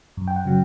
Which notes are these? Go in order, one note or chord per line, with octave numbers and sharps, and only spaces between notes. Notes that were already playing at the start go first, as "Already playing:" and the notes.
F#2
G5
F#5
C#3 F#3